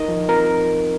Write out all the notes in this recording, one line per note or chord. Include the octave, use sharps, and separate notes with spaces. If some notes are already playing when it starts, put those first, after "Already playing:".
Already playing: D#4 A#4 D#5
F3
C4 F4 A#4